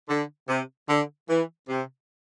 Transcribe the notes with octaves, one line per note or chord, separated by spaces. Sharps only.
D3
C3
D3
E3
C3